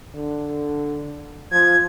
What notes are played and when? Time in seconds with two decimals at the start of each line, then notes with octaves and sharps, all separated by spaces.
0.14 D3
1.52 F3 G#6